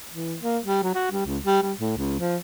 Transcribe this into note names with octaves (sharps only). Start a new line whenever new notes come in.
E3
A#3
G3
F#3
F#4
G3
C#2
G3
G3
A2
C#2
F3